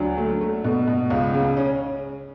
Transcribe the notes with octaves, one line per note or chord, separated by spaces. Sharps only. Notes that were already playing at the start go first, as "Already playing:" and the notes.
Already playing: D2 F#3 D4
A3
A3
B2
B2
C#2
C#3
C#4